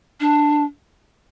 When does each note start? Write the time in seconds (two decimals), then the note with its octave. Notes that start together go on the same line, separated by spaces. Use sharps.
0.20 D4